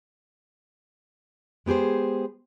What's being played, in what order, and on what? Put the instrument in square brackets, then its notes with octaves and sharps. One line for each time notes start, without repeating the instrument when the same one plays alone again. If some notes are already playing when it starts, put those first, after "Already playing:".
[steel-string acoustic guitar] G#3 B3 G4 G#4 C5